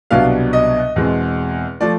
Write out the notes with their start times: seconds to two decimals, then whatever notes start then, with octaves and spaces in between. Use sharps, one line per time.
0.11 C2 B2 F#3 B3 D4 F5
0.53 D#5
0.96 E2 B2 G#3 C4
1.81 F3 A3 D5